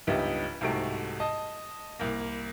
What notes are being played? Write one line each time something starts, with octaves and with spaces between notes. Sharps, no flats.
C#2 G2 B3 D#4 G4 E5
C2 G#2 C3 A3 F#4 D7
D#5 A5
C2 A#3